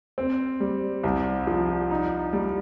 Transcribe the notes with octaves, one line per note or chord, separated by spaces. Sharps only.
C4
G3
C2
F3
D#4
G3